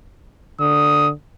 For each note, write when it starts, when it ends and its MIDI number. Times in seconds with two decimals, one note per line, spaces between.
0.60 1.12 50
0.60 1.09 87